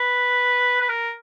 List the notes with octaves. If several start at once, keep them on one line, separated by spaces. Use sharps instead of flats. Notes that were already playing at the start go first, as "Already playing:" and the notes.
Already playing: B4
B4
A#4